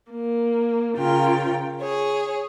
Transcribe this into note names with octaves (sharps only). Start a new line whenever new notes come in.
A#3
C#3 F4 A#4 G5
G#4 C#5